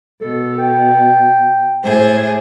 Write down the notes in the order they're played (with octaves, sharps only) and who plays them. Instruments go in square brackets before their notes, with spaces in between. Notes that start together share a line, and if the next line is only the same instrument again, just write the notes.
[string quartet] B2 [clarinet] A4
[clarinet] G5
[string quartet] A2 G#4 C5